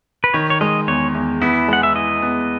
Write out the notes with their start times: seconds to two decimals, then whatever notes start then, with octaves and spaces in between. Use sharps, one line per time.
0.24 B4
0.34 D#3 C#5
0.50 C#5
0.61 G#3 D#5
0.88 E2 C#5
1.14 E2
1.41 B3 E4
1.68 G#3 F#5
1.83 E5
1.95 E4 D#5
2.22 B3